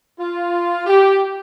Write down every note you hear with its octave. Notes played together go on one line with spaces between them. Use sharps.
F4
G4